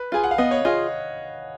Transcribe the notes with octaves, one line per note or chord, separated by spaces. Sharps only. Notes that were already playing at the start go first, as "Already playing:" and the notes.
Already playing: B4
F4 G#4 G#5
F#5
F5
B3 D#5
C#5
F4 G#4 D#5